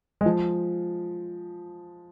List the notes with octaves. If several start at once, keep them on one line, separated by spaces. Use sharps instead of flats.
G#3
F3